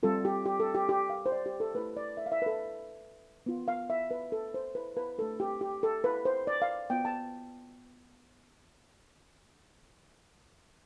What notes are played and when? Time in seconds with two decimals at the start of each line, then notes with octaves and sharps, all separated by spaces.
0.03 G3 C4 F4 A4
0.25 G4
0.46 G4
0.60 A4
0.74 G4
0.89 G4
1.10 F5
1.26 C5
1.32 D5
1.46 G4
1.60 A4
1.74 A3 E4 G4 B4
1.97 D5
2.17 E5
2.26 F5
2.32 E5
2.42 B4
2.46 A4
3.46 B3 F4
3.68 F5
3.90 E5
4.11 B4
4.32 A4
4.54 C5
4.75 B4
4.97 B4
5.18 A3 D4 G4 A4
5.40 G4
5.61 G4
5.83 A4
6.04 B4
6.25 C5
6.47 D5
6.62 F5
6.90 B3 F4 G5
7.05 A5